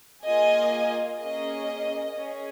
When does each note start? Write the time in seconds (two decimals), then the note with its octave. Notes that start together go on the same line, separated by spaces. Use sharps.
0.25 A#3 F4 G#4 D#5 G#5
1.20 A#3 C#4 G#4 D#5
2.16 C#4 G#4